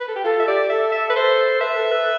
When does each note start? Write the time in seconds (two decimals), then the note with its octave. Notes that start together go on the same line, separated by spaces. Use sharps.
0.01 B4
0.08 A4
0.16 G4
0.24 F4 A4
0.40 E5
0.47 G4 D5
0.70 A4 E5
0.92 E5
1.10 B4
1.16 C5
1.60 B4 E5
1.76 A4
1.91 B4